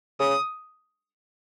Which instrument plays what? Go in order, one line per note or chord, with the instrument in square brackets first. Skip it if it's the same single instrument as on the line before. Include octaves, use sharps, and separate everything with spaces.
[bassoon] C#3 [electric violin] D#6